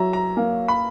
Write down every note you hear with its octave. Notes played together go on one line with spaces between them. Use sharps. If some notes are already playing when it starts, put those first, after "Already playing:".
Already playing: F#3 E5 A#5
A#5
A#3
B5